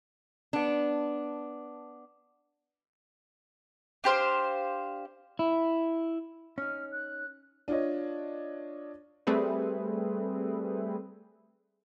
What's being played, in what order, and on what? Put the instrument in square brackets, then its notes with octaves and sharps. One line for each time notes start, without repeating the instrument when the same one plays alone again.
[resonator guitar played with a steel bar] B3 D4
[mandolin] D4 G4 C5 F5
[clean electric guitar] E4
[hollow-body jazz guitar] C#4 D#4 [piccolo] F6
[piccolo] F#6
[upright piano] D4 F4 C#5 D#5
[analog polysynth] G3 A3 C4 G#4 A4 B4